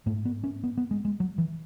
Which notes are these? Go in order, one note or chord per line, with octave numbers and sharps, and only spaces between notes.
G#2 A3
B3
C#4
B3
B3
G#3
G#3
F#3
E3